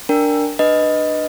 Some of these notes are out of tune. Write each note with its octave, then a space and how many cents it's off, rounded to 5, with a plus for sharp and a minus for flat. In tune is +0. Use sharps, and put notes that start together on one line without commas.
D4 +0 A#4 -5 G5 +0
D4 +20 B4 +0 D#5 +0